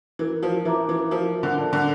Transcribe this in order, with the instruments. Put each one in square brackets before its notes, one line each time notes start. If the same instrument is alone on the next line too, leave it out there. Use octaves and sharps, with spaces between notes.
[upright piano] E3 [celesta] A#4
[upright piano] F3
[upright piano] E3 [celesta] E5 A#5 D6
[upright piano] E3
[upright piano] F3 [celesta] A#4
[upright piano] D3
[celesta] D5 A5
[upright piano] D3